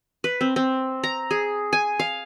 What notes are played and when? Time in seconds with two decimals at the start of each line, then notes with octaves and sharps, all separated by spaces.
0.24 B4
0.41 C4
0.56 C4
1.04 A#5
1.31 G#4
1.73 G#5
1.99 F5